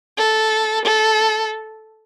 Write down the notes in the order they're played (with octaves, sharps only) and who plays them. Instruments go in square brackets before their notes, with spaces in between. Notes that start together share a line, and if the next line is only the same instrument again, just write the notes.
[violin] A4
A4